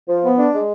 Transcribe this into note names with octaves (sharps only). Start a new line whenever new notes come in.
F3
B3
D4
G#3